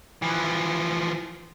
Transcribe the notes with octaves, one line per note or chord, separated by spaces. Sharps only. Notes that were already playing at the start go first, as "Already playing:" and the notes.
E3 F3